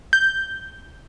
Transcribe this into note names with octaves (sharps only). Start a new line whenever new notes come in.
G6